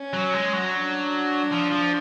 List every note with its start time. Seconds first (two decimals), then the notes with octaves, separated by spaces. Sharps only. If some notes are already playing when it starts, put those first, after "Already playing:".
Already playing: C#4
0.13 F#3
0.33 G#3
0.53 F#3
0.73 D4
1.52 F3
1.71 F3